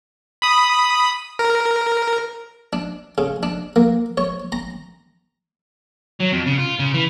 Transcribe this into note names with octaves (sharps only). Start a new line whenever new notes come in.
B5 D#6
A#4
D4
C#3
D4
A#3
C#5
A#5
F#3
F2
C#3
F4
C#3
E3